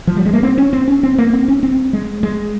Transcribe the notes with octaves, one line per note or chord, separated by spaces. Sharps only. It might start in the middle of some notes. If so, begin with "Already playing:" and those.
F3
G3
G#3
A#3
C4
C#4
C4
C#4
C4
A#3
C4
C#4
C4
G#3
G#3